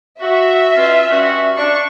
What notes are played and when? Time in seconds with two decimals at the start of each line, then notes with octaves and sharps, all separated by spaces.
0.21 F#4 E5
0.76 B2 C#4 F4
1.10 G2 C#4 F#4
1.57 D4 C#6